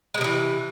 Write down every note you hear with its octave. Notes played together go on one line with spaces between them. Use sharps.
C3 D#3 E3 G#3